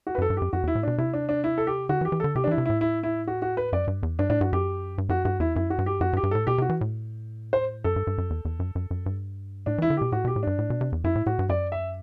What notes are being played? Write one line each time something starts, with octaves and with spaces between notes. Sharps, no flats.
F#4
B4
F#2 A4
G2
F#2 G4
F#2 F#4
E2 E4
A2
B2 D4
C3 E4
D4
D4
E4
A4
G4
D3 F#4
E3
G4
E3
D3 A4
C3 G4
D4
E3 E4
C3
A2 E4
E4
E4
F#4
F#4
B4
F#2 D5
G2
E2
G2 D4
A2 D4
G2 F#4
F#2 G4
G2
F#2 F#4
G2 F#4
E2 E4
F#2 E4
F#4
G2
G4
F#2 F#4
G2
G4
G2
A2 A4
B2 G4
C3 F#4
E3
A2
C5
F#2 A4
G2
G2
F#2
E2
E2
F#2
F#2
F#2
G2
A2 D4
E3 E4
D3
B2 G4
A2 F#4
B2 G4
A2
G2 D4
A2
B2
C3
E2
F#2 E4
A2
A2 F#4
G2
F#2 D5
E5